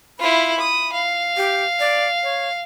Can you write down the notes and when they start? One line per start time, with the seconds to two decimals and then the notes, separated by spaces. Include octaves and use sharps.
0.19 E4 F4 B5
0.60 D#6
0.93 F5
1.37 G4
1.80 D5
2.23 C#5